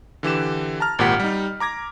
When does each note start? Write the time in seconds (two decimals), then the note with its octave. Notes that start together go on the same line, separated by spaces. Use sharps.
0.23 D3 E3 G4 E7
0.80 A5 A#5 F6
0.99 G#1 A#2 G4 F#5 B6
1.20 G3 D#4
1.60 A#5 D6 G#6 A#6